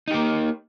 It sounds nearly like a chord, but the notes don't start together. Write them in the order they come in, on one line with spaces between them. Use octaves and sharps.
D#4 G4 A#3